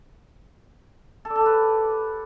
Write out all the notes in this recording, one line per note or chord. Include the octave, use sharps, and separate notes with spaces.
A4
D5
A4
G4
B4